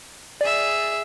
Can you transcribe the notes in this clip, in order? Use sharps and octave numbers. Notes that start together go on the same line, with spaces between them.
G#4 D5 E5